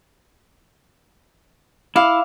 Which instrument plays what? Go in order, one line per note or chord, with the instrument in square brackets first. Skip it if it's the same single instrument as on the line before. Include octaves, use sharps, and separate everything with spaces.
[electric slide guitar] E4 [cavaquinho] F5 D6